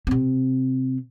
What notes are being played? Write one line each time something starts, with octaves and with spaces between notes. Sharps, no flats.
C3 C4